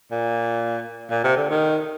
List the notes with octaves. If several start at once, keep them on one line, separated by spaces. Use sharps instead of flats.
A#2
A#2
C3
D3
D#3